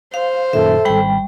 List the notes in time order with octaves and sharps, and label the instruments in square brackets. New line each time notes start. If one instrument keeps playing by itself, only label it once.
[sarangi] C5 [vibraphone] F5
[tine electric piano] F#2 A#2 D#3 [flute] A4 [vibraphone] E5
[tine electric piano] G#1 B5 [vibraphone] G3 G5